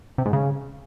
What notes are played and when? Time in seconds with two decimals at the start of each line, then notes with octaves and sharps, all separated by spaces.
0.18 C3
0.26 G#2
0.33 C#3